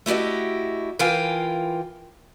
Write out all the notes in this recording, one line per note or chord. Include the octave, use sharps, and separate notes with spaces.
A3 E4 F#4 G4 D#5
E3 F4 A#4 F5 G5 G#5